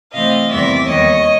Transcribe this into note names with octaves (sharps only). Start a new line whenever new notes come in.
C3 E3 A3 C4 D#5 F5
E2 C3 D#3 G3 B3 D5 E5
D#2 D#3 G3 B3 C#5 D#5